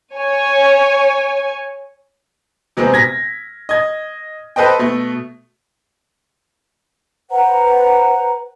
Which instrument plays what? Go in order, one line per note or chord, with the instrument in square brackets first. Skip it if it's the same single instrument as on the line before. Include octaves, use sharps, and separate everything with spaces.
[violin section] C#5 G#5
[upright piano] C3 F#3 G#3 B3 C4
G#6 A#6 B6
D#5 G#6
A4 B4 C5 D#5 G5
B2 A3
[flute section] B4 C5 F#5 A#5